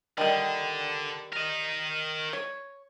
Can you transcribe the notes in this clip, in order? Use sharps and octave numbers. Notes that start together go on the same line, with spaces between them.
D3 D#3 G3 D#4
A#4 D#5
C#5